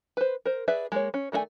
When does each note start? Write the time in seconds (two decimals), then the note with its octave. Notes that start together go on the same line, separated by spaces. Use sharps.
0.17 B4 C5
0.45 A#4 C5
0.68 G#4 B4 D5 E5
0.92 G#3 A#3 C#5
1.14 C#4
1.32 D#3 A3 E4 D5 G#5